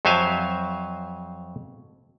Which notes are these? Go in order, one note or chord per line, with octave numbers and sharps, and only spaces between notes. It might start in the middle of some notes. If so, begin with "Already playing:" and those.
F2 F#3 C5 E5 F5 G#5